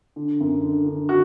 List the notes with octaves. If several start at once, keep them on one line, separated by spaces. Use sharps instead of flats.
D3
F#2
D3
D3
F#4